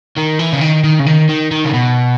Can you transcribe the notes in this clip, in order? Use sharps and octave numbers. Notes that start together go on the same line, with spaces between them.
D#3
E3
C#3
D#3
D#3
C#3
D#3
D#3
D#3
C#3
B2